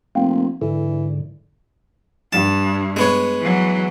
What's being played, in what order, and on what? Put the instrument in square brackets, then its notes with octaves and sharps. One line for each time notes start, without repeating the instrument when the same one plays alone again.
[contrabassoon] F1 [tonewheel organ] A#3 C4
[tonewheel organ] G#2 D3 [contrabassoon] E3
[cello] G2 [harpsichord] A5
[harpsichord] G#3 B3 C#5
[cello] E3 F#3